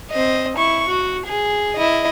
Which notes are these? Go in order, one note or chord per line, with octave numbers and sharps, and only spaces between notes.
C4 D#5
E4 C#6
F#4
G#4
E4 D#5